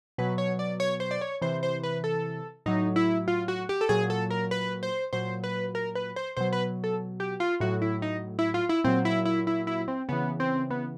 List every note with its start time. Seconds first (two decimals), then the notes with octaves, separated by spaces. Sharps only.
0.18 B2 F#3 B4
0.38 C#5
0.59 D5
0.80 C#5
1.00 C5
1.11 D5
1.21 C#5
1.42 C3 E3 C5
1.63 C5
1.83 B4
2.04 A4
2.66 A2 F#3 D#4
2.96 E4
3.28 F4
3.48 F#4
3.69 G4
3.81 A4
3.89 A#2 F#3 G#4
4.10 A4
4.30 A#4
4.51 B4
4.83 C5
5.13 A#2 F#3 C5
5.44 B4
5.75 A#4
5.95 B4
6.16 C5
6.37 B2 F#3 C5
6.53 B4
6.84 A4
7.20 G4
7.40 F4
7.60 A2 F#3 F#4
7.82 E4
8.02 D#4
8.39 E4
8.54 F4
8.69 E4
8.84 A#2 F#3 C4
9.05 E4
9.25 E4
9.47 E4
9.67 E4
9.88 C4
10.09 C#3 E3 B3
10.40 C4
10.71 B3